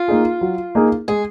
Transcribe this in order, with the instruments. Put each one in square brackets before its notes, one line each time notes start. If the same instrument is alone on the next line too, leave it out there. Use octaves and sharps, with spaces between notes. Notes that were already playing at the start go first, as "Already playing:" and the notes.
Already playing: [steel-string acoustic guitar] F4
[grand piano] A#3 D#4 G#4
F#3
A#3 D#4 G#4
[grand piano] G#3 [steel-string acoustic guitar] G#4